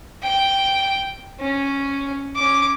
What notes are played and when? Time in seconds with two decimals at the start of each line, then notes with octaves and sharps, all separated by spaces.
0.23 G5
1.40 C#4
2.35 C#4 D6